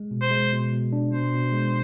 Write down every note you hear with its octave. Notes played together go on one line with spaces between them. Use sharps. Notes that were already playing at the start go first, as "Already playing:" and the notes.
Already playing: G#3
B2
C5
G#3
B2
B2
D4
B2 C5
B2
G#3